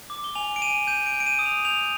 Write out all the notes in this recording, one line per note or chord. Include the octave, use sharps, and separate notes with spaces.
D6
G7
G#5 F7
D7
G#5 D#7
G6 D#7
D7
G6
D7
D#7
D#6
F7
G6 F7